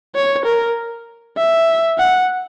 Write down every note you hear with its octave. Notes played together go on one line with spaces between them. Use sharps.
C#5
A#4
E5
F#5